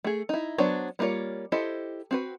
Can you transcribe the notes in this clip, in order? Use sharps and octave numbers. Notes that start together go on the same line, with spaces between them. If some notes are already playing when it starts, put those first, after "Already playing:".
A3 G#4
D#4 E4
F#3 B3 D4 C5 C#5
G3 A#3 D4 F4 C#5
E4 G4 A4 C5 D#5
C4 F#4 B4